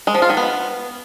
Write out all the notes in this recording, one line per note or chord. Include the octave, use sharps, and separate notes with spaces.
G#3
F3
F4
D#3
B3